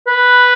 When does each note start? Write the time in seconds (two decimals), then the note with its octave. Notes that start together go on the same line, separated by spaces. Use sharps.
0.07 B4